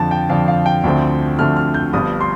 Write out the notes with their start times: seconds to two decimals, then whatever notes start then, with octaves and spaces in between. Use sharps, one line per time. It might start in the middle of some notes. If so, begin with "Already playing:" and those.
Already playing: F2 D3 F3 A5
0.11 G5
0.29 F2 D3 F3 F5
0.48 F5
0.66 G5
0.84 D2 D3 F3 A3 C4
1.38 D2 D3 F3 A3 C4 F6
1.56 F6
1.74 G6
1.93 G1 G2 F3 D#6
2.21 C6